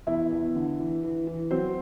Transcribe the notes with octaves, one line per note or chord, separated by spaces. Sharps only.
E2 E4 E5
E2
D3
E3
E3
E3
F#3 C4 C5